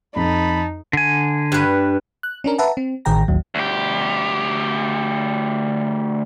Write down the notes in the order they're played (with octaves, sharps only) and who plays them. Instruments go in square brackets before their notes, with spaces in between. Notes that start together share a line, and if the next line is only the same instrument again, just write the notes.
[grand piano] F2 [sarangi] D#4 [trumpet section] A5 B5
[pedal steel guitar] D3 G#5
[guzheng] G2 B4
[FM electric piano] F#6
C#4 D4 A#4
B4 E5 F#5 A5 A#5
C4
A1 D#3 G#4 G5 A#5 A#6
A1 D#2 F#3
[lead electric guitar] D2 G4